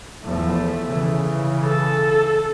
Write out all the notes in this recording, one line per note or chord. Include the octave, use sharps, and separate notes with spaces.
E2 F3 A3
C#3 E3
A4